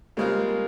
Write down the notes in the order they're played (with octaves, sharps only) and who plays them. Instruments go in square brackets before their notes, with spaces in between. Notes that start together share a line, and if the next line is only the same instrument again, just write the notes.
[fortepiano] C#3 G#3 C4 F4 A#4 [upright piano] G3 A#3